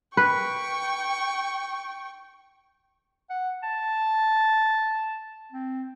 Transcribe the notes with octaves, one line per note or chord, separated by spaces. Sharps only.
B4 G5 C#6
F#5
A5
C4